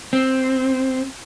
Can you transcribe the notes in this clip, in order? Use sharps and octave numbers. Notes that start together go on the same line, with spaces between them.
C4